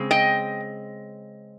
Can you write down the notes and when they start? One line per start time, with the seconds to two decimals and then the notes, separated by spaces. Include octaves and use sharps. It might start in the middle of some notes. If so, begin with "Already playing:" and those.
Already playing: C#3 G#3 C4
0.11 D#5 G5